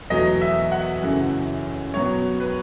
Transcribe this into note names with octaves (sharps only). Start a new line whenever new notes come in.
E2 B2 F#3 A3 D#5
E5
F#5
F#2 C#3 E3 A3
B2 F#3 B3 C#5
B4